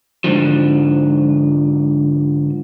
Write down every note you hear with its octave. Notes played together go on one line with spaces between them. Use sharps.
G#2 D3 F3